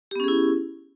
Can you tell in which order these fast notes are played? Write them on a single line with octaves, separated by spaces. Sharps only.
G4 B3 C#4 G#4 E4